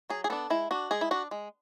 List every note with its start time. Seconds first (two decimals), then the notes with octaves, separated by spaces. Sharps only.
0.10 F#3 G#4
0.24 G#4
0.30 B3 D4 A4
0.50 G#3 E4
0.71 D4 F#4
0.91 G#3 G#4
1.01 E4
1.11 D4 F#4
1.31 G#3